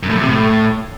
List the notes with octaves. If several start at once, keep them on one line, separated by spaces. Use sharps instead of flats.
F#2
A2
F#2
C3
A2